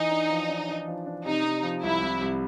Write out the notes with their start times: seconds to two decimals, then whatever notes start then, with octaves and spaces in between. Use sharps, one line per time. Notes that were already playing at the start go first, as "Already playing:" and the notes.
Already playing: E3 D#4
0.10 D4
0.30 F3
0.49 D4
0.68 D4
0.88 F3
1.06 D4
1.25 C3 D#4
1.44 C3
1.63 F3
1.82 C2 E4
2.01 C2
2.21 C2